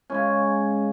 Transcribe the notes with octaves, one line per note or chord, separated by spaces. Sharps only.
C#3 G#3 C#4 G#5